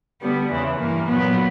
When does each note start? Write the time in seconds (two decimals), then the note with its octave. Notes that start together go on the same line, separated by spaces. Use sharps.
0.21 D3 G3 B3
0.51 E2 C#3 E3
0.79 G2 E3 A#3
1.08 A#2 F#3 B3